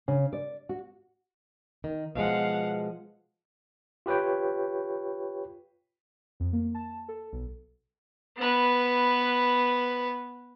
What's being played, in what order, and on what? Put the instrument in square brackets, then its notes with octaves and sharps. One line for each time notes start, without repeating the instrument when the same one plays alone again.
[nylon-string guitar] C#3
D5
F#4
[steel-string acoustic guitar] D#3
[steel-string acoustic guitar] B2 F3 G#3 [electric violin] F5 F#5
[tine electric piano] F4 G4 B4 C#5 G5
[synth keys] F2
A#3
A5
A4
B1
[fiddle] B3 B4